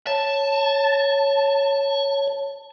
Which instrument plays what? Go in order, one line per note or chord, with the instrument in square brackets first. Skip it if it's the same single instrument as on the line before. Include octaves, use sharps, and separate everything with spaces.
[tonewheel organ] C#5 [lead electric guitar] A5